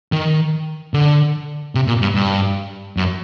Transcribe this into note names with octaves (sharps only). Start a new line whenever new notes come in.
D#3
D3
C3
A#2
G2
G2
F#2